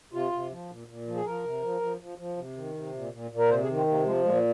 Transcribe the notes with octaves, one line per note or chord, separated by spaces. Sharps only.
C3 F4
C3
F3
A#2
A#2
F3
G#4
F3 A#4
C3
F3
F3
F3
F3
C3
D#3
C3
A#2
A#2
A#2
A#4
C3 C5
G#4
D#3
C4
C3 A#3
F3 G#3
A#2 G#3